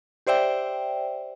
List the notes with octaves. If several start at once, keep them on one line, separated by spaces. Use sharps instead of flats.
G4 C5 D5 E5 G5